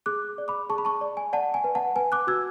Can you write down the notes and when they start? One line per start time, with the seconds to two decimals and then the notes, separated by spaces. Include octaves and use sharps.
0.06 G#4 D6 F#6
0.38 D5
0.48 B5 D6
0.69 G#4 A5 C#6
0.78 B5
0.85 A5 C#6
1.01 D5
1.17 G#5
1.33 D5 F#5 A5
1.54 G#5
1.64 B4
1.75 F#5 A5
1.96 B4 G#5
2.12 D6 F#6
2.27 F#4 E6 G#6